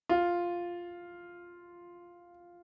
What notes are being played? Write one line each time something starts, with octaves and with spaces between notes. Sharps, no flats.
F4